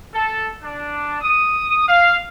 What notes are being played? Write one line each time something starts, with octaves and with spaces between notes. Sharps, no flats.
A4
D4
D#6
F5